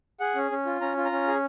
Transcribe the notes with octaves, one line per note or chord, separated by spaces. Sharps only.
G#4 F#5
C#4
C#4
F4
C#4 A#5
F4
A#5
C#4
G#4